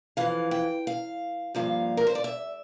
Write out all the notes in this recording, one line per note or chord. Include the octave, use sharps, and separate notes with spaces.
F2 C3 E3 F5
G5
F5
G2 F3 A#3 F5
A#4
C5
D5
E5